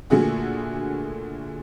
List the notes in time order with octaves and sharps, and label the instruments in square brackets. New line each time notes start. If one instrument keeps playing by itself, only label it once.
[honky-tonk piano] A#2 D3 A3 F#4 G#4